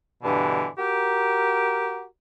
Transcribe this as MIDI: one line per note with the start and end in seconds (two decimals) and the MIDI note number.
0.23 0.66 43
0.23 0.66 47
0.23 0.66 50
0.23 0.66 52
0.78 2.04 66
0.78 2.04 67
0.78 2.04 70